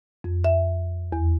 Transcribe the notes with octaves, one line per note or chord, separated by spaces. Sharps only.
F2
E5
E2